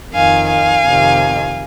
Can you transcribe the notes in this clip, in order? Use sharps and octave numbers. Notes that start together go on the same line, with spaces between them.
F2 D#3 F5 G#5
F5 G#5
F2 C3 D#3